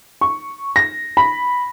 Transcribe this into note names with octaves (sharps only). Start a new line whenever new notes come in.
C#6
A#6
B5